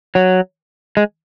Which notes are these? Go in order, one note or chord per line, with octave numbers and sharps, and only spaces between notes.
F#3
G#3